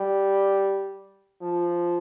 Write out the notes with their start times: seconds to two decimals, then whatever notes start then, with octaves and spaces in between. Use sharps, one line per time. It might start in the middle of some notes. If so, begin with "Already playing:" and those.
Already playing: G3
1.42 F3